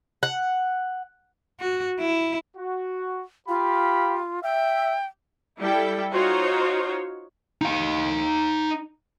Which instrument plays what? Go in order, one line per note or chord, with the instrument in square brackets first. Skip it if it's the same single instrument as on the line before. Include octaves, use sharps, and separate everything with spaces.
[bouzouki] F#5
[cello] F#4
E4
[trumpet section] F#4
[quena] F4 [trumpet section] G4 F5 B5
[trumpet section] E5 [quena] G5
[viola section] G3 E4 A4 G5
D#4 F4 F#4 C5 C#5
[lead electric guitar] D#4 F5